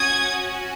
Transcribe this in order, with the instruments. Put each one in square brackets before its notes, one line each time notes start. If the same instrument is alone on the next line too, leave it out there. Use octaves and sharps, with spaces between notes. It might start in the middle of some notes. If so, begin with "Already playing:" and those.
Already playing: [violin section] C#4 F#4 D#6 G#6